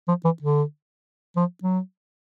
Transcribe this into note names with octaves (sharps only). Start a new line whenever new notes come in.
F3
E3
D3
F3
F#3